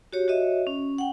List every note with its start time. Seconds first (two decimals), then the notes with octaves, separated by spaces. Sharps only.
0.13 F#4 G4 C#5
0.28 F#4 C#5 D#5 E5
0.67 C#4
0.98 F#5 G5